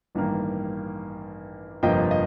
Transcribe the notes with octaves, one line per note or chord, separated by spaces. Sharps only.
A1 G2 D#3 A#3
G1 F2 C3 F3 A#3 D#5 G5
D#5